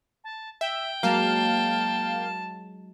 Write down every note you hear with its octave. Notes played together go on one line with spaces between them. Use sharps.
A5
E5 G5
F#3 G#3 A#3 F5 A5